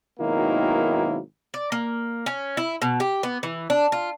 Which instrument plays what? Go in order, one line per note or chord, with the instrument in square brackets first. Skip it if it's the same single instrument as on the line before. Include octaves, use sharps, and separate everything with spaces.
[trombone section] G#1 B2 D#3 F#3 A#3 E4
[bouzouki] D5
A#3
C#4
E4
B2
G4
B3
E3
D4
F4